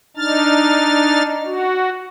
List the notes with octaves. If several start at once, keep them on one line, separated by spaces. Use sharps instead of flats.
D4 D#4 F6 A6
F#4